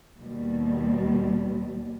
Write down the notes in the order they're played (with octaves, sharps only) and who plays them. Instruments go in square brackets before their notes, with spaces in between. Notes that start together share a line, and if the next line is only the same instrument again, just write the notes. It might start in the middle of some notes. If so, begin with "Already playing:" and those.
[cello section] D#2 B2 G3